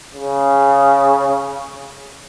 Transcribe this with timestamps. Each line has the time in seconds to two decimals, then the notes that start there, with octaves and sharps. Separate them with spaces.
0.14 C#3